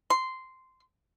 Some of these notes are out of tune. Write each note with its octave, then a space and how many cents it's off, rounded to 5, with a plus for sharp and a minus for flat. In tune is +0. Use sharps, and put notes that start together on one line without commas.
C6 -10